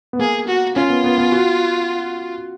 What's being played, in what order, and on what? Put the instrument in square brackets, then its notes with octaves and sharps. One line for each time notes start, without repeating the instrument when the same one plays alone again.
[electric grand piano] B3
[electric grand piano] A#3 [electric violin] G#4
[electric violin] F#4
[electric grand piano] C#4 [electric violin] F4
[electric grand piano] B3
B3
B3
F#4